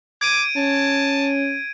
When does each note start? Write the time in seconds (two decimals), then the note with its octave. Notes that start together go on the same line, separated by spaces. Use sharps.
0.21 D6 G#6 D7 D#7
0.57 C#4 A5